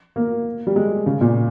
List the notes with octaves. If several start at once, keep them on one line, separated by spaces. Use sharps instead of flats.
A#3
G3
G#3
C#3
A#2